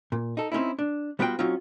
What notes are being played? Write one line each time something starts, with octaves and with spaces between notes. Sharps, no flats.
A#2
D#4 A4
C4 C#4 D#4 E4
D4
G3 B3 F4 F#4 G5
F#3 C4 C#4 D#4 F4